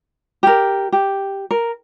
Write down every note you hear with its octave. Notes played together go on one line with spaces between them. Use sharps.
G4 A#4
G4
A#4